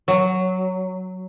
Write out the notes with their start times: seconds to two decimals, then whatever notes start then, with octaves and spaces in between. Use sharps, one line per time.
0.08 F#3